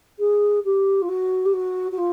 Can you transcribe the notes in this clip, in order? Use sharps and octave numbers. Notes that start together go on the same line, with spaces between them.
G#4
G4
F4
F#4
G4
F#4
F#4
F4